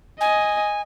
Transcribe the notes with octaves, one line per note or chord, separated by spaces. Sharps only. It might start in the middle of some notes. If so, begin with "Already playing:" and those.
D#5 G#5